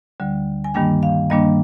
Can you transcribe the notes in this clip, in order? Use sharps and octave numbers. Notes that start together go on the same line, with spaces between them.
D2 D3 G3
G#5
G2 D#3 G3 A#3 D4 G5
F5
G2 D#3 G3 A#3 D4 D#5